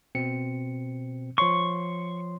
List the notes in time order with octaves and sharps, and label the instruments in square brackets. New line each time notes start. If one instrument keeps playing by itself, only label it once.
[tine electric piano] B2 C4 C#7
[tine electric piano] F3 C#5 C6 [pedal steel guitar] C#6